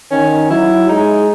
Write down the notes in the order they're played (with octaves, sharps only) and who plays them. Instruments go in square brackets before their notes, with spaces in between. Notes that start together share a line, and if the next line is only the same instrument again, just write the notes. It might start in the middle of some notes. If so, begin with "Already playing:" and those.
[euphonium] D#3 [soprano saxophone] C#4
[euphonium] F#3 [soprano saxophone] E4
[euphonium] G#3 [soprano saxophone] D#4